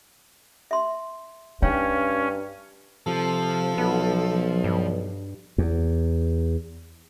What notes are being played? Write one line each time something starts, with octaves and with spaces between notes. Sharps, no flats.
E5 C6
G2 C#4 D#4 C#5 F5 G5
C3 F3 A4
B1 B3
G2
E2